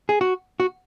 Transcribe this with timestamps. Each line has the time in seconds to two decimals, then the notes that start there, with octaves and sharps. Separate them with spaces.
0.09 G#4
0.21 F#4
0.60 F#4